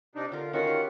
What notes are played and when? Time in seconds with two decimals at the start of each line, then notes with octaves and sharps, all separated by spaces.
0.15 C3 D4 D#4
0.32 D3 F4 A#4
0.53 D#3 C#4 F4 F#4 F#5
0.67 G4